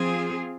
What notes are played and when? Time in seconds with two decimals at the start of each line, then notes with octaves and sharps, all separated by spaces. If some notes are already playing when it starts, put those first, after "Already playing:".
Already playing: F3 C4 F4 G#4